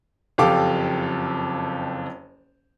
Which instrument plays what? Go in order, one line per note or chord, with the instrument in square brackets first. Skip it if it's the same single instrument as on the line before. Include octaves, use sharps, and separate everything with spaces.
[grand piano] F#1 F2 G4 A4 F5 D6